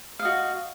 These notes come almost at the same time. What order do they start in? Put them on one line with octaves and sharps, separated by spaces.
F5 D#5 F#4